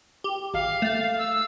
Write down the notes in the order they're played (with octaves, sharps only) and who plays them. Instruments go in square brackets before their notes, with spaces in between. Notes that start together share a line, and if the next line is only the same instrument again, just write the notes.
[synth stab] G4
[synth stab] G#1 [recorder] F5
[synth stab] A3
[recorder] E6